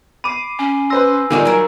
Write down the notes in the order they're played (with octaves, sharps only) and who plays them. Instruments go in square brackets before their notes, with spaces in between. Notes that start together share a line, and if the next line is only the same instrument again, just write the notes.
[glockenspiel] B5 C7 [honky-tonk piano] D6 D#7
[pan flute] C#4 [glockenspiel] G#5
[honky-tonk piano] B4 C5 C6 [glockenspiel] E6 A#6
[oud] E2 D3 D#4 [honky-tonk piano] D#3 G3 F4 [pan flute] G#5
[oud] F#3 A#4